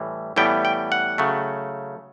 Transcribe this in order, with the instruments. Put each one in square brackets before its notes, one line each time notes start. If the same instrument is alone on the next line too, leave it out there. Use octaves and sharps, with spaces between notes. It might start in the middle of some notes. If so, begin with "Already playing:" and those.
Already playing: [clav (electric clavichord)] A2 E3 G3
A2 E3 G3 B3 G5
G5
F#5
C#3 F#3 A3